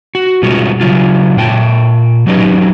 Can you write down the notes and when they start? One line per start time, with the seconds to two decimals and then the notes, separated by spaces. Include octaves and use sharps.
0.15 F#4
0.43 B2 G3 G#3 B3 F4 F#4
0.81 C#3 F#3 F4
1.37 A#2 G5 A5
2.27 F#3 C#4 D#4 G4 B4 D#5